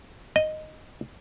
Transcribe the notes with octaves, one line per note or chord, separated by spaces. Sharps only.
D#5